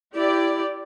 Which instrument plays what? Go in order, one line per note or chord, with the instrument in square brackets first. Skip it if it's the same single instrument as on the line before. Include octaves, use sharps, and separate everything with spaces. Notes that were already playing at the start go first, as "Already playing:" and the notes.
[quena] E4 [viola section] G4 D5